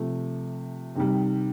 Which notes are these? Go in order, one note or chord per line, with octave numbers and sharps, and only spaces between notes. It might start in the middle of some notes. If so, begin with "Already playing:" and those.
Already playing: C3 F3 A3
C3 D#3 G3